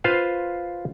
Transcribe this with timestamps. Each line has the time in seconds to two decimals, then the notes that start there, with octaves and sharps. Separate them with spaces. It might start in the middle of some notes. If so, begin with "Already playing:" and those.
0.04 F4 B4 C5 F5